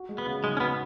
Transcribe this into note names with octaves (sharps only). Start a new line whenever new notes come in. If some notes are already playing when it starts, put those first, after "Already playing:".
Already playing: F#4
G#3
B3
C#3
G#3 D#4
C#4
B3 F#4